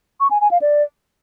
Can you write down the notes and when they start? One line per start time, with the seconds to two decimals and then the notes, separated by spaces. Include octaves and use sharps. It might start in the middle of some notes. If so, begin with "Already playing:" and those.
0.20 C#6
0.31 G#5
0.41 G#5
0.51 F5
0.62 D5